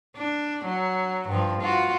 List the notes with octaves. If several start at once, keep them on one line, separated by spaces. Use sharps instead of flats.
D4
F#3
G2 F3
F4 F#4